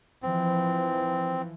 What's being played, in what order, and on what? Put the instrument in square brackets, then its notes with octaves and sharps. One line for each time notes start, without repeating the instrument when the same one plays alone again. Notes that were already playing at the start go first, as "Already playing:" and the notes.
[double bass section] E3 F3 [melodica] C4